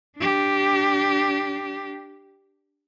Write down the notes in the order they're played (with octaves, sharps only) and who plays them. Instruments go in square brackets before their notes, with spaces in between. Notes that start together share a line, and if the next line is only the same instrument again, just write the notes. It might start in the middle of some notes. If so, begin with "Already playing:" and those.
[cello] D4 G4